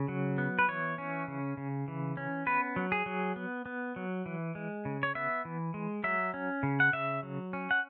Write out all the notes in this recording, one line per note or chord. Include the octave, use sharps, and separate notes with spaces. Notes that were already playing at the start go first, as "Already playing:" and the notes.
Already playing: C#3
F#3
B3
B4
E3 C#5
C#4
C#3
C#3
E3
C#4
B3 B4
F#3
G#4
F#3
B3
B3
F#3
E3
G#3
C#3
C#5
B3 E5
E3
G#3
F#3 E5
C#4
C#3
F#5
C#3 E5
F#3
C#4
F#5